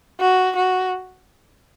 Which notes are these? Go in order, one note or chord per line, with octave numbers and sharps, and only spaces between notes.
F#4
F#4